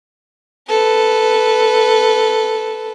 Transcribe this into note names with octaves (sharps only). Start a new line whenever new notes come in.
A4 B4